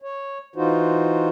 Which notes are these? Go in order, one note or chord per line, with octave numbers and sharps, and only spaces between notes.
C#5
E3 D#4 F4 F#4 C5